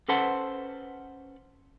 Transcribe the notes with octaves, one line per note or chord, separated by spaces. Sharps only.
C#4 A4 B4 C5 F#5 A5